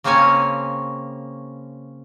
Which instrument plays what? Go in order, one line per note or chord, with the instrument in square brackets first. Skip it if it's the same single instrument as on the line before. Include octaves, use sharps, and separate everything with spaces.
[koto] C#3 A#3 C4 C#4 C#5 G#5